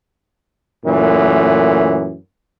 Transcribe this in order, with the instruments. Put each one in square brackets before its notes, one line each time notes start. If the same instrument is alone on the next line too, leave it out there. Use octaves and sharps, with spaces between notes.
[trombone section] F#2 A#2 E3 A3